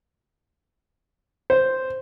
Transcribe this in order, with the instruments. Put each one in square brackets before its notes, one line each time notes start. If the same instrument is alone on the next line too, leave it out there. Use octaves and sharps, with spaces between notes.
[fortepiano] C5